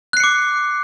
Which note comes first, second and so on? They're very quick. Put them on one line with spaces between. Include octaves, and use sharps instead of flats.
F#6 C7 C#7 D6